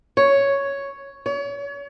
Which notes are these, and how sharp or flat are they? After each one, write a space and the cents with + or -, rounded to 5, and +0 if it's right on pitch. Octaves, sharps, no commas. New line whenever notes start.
C#5 +5
C#5 +35